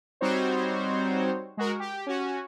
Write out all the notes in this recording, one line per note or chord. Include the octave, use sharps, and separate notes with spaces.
G3 C4 D#4 F#4 C5 C#5
G#3 F#4 A#4
G4
C#4 F#4